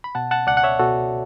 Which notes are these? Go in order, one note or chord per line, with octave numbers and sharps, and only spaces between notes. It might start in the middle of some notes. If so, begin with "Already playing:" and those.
B5
B2 F#5 A5
F#5 A5
C#2 D5 F#5
F#5
C#5 E5
B2 F#4 A4